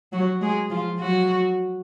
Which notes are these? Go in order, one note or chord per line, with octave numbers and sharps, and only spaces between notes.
F#3 F#4
G#3 G#4
F3 F4
F#3 F#4